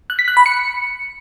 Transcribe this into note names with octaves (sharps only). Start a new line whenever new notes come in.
F#6
B6
F#6
B5
C#7